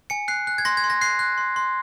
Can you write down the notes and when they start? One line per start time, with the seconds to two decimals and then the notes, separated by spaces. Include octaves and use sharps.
0.10 G#5 C#7
0.28 F#6 C7
0.47 F#6
0.58 G#6
0.65 C6 A#6
0.77 G#6
0.84 C6
0.90 A#6
1.01 F#6 C7
1.19 F#6
1.38 C6
1.56 C6